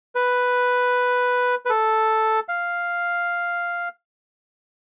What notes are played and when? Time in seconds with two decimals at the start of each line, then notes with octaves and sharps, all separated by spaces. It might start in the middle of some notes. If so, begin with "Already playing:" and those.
0.15 B4
1.65 B4
1.70 A4
2.49 F5